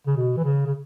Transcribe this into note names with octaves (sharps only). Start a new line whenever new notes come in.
C#3
B2
E3
C#3
C#3